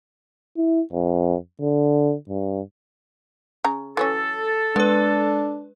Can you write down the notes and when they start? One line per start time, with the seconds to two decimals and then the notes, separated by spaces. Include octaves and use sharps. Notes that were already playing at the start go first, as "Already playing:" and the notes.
0.57 E4
0.93 F2
1.61 D3
2.28 G2
3.64 C#3 A#5
3.97 E3 F#3 C#4 A4
4.76 G#3 B3 D4 B4